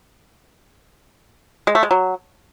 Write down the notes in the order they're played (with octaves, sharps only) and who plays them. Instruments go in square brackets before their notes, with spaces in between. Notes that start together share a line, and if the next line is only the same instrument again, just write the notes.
[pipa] G#3
A3
G#3
F#3